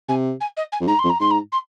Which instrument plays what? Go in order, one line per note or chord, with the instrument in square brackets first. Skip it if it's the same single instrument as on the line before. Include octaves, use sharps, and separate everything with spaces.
[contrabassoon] C3 [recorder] G#5
[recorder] G#5
D#5
G#5
[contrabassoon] F2
[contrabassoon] G#2 [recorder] A#5
[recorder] C6
[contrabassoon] F2
[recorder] A#5
[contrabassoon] G#2 [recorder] C6
[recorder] A#5
C6